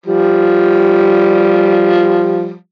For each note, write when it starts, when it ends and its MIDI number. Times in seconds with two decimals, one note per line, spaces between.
0.06 2.55 53
0.06 2.55 55